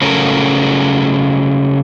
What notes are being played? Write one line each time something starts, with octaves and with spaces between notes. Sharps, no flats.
C#3 F#3 A3 C#4 A#4